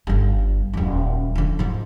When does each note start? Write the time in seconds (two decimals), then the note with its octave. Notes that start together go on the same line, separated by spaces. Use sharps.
0.07 G1 G3
0.73 D#1 F#3
1.36 D3 F3
1.59 G#2 F3